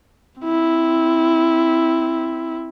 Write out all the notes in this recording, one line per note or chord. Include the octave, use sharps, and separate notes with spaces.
C4 E4